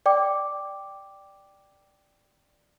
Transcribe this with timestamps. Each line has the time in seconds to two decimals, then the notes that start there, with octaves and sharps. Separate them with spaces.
0.06 D5 G5 D6